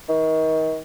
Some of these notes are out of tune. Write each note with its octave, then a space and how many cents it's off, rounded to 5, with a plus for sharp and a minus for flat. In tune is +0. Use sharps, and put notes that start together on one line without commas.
D#3 +30